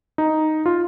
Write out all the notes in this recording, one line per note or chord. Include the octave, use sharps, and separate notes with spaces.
D#4
F4